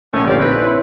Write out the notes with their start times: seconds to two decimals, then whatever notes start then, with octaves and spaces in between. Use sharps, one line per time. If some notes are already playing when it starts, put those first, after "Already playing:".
0.14 A#1 A#2 D3 A3 B3 C#4
0.28 G1 C3 C#4 G4 D5 F5
0.40 C4 D#4 B4 D5
0.62 E4 C#5 C6